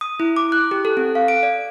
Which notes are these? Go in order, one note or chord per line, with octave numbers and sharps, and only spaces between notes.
D#6
E4
D6
F#6
G4
A4
C4
F5
D7
D5